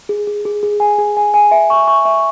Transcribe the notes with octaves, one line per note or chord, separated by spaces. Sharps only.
G#4
G#4
G#4
G#4
G#5
G#4
G#5
G#5
E5
C#6
C#6
E5